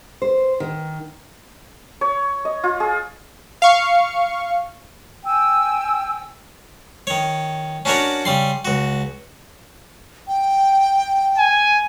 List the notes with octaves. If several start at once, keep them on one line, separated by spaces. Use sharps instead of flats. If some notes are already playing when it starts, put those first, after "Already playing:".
C5
D#3
C#5
D#5
F4
G#4
F5 C#6
G5 G#5 E6
D#3 C#5
C#4 D4 F#4 A#4 C#5 D5
C#3 G3 C6
C#2 F#4
G5
G#5